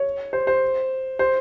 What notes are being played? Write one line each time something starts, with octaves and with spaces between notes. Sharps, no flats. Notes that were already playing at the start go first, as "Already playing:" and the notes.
Already playing: C#5
C5
C5
C5